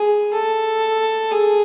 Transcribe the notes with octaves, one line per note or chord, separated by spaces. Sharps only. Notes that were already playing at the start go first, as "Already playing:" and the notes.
Already playing: G#4
A4
G#4